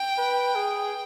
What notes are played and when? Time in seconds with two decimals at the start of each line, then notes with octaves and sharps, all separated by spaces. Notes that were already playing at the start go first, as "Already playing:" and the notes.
Already playing: G5
0.18 B4
0.55 G#4